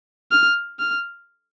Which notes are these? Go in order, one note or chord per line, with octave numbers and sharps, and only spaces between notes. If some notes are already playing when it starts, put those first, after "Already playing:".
F6
F6